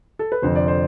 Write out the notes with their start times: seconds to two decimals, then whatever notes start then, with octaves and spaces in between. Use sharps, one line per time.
0.19 A4
0.32 B4
0.42 F1 F2 D3 C5
0.55 D5
0.68 C5